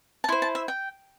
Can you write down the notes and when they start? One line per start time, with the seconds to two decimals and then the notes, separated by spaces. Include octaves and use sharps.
0.24 A5
0.29 E4 C6
0.32 C5
0.42 A5
0.55 E5
0.68 G5